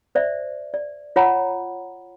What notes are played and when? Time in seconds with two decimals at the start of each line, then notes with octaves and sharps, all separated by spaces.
0.15 C5 D5 E5
0.74 D5
1.16 F4 C#5 F#5 A#5 B5